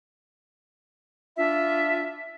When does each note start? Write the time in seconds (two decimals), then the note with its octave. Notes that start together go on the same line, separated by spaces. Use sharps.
1.37 D4 F4 E5